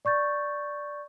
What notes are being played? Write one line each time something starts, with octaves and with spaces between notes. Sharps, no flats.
D5 C#6 G6 A6